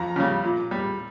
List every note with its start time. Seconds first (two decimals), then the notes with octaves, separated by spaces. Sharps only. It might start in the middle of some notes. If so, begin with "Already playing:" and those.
Already playing: F2 A#5
0.16 C#3 G3
0.43 A#2
0.71 G3